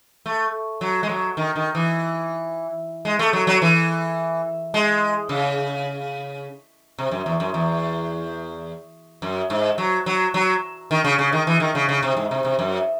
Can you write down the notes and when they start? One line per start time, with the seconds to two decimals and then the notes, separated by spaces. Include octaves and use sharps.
0.26 A3
0.81 F#3
1.03 G#3
1.09 F#3
1.37 D#3
1.56 D#3
1.75 E3
3.05 G#3
3.19 A3
3.33 F#3
3.47 F#3
3.62 E3
4.74 G#3
5.29 C#3
6.98 C3
7.11 F#2
7.26 E2
7.40 F#2
7.54 E2
9.22 F#2
9.50 G#2
9.78 F#3
10.06 F#3
10.34 F#3
10.91 D#3
11.04 C#3
11.19 C#3
11.32 D#3
11.47 E3
11.60 D#3
11.75 C#3
11.89 C#3
12.03 C3
12.17 G#2
12.31 C3
12.45 C3
12.59 F#2